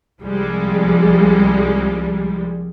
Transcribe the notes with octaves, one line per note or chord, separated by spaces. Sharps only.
C2 F3 G3 G#3